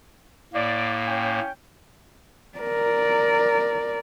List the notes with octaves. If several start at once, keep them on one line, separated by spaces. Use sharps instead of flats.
A2 A#3 D5
C#4 G5
A#4 D5